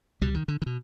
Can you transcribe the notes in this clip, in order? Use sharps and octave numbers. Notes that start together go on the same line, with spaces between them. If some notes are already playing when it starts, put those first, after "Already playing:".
C#2 B2 G3
D#3
D3
D#3
B2